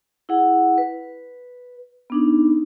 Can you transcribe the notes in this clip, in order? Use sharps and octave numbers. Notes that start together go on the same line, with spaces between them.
E4 G#4 F#5
B4
B3 D4 D#4